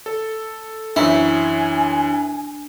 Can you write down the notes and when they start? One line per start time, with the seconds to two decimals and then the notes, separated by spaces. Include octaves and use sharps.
0.06 A4
0.96 F#2 E3 D4 E4 G#5